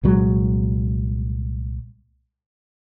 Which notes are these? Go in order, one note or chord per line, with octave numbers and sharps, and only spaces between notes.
C2 A#2 F#3 G#3